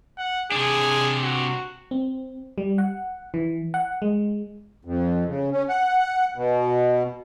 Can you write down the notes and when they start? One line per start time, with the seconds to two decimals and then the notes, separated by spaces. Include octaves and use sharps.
0.18 F#5
0.52 C3 D4 G#4
1.23 F#4
1.91 C4
2.58 G3
2.78 F#5
3.34 E3
3.74 F#5
4.02 G#3
4.85 F2
5.27 C#3
5.52 C#4
5.69 F#5
6.36 B2